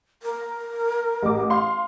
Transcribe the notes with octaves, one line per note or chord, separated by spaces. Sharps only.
A#4
A1 D6
F5 C6